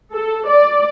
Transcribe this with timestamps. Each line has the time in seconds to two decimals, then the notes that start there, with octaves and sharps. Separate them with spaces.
0.12 A4
0.48 D5